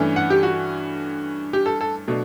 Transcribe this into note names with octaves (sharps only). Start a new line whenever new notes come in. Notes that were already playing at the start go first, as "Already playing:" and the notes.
Already playing: G2 E3 A3 C#4
F#5
G4
F#4
G4
A4
A4
B2 F#3 A3 D4